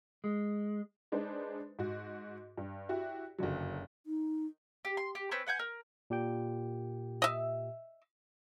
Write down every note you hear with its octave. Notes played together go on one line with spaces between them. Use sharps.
G#3
G#3 D4 D#4 B4 C5
G#2 F#4
G2
E4 F#4 G4
F#1 G2 D3 F#3
D#4
G4
C6
G4
C4 C#4 B4 C5
B4 F#5 G#5 G6
A#4
A#2 G4 G5
D#5 E5